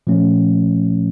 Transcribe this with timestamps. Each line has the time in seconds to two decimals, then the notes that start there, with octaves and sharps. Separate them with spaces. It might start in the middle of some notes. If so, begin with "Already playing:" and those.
0.07 A#2 F3 A3 C#4